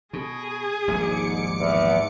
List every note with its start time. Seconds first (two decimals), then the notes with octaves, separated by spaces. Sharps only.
0.13 B2 G#4
0.88 D#1 A#1 G#2 G#3 D6 C#7
1.60 E2